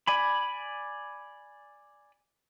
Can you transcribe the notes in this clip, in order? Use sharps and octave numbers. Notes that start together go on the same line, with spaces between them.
D5 G#5 B5